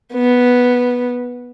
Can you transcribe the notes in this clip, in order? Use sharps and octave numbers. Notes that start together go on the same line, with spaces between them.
B3